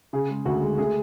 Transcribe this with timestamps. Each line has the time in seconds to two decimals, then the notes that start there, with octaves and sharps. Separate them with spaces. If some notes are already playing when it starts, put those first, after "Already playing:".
0.13 C#3 G#4
0.29 G#3
0.45 D2 F#4
0.62 G#3
0.78 A3 G#4